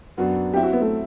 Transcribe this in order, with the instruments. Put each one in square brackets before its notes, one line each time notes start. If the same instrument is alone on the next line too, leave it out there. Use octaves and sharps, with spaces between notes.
[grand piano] F#2 F#3 B3 D4 F#4
[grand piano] F#3 C4 E4 [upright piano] G4
[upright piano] F#4
B3
A3